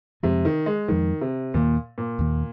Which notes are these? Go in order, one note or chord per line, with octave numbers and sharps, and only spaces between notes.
F2 C3 F3 G#3
D#3
G#3
F2 D#3 F3 G#3
C3
D#2 A#2 D#3 A#3
A#2
D#2 D#3 A#3